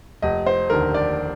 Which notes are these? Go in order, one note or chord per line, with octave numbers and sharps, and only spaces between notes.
F1 D#5
C5
D#2 D3 A#4
D5